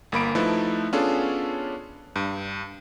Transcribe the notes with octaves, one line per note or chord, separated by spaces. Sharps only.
G1 A#3 B5 D7
F3 A3 D#4 E4 A4 B4
B3 C#4 D4 F4 G#4 A4
G2